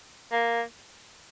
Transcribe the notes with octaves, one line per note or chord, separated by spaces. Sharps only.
A#3